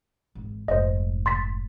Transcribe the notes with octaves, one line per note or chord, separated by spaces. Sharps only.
G#1 E3
F1 G#2 C5 D#5
C6 A6 B6